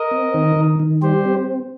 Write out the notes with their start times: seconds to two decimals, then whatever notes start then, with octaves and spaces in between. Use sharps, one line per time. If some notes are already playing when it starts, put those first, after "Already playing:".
Already playing: A#4 D#5
0.11 C4
0.34 D#3
0.56 D#3
0.80 D#3
1.02 G3 G4 C5
1.25 C4